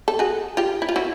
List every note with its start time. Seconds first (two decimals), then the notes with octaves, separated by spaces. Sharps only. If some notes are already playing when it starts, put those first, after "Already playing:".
0.08 A4
0.19 F#4 G#4
0.57 F4 G4
0.82 E4
0.89 F4
0.96 E4 F#4